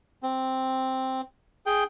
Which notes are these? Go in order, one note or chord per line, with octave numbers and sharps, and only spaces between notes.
C4
G#4 G5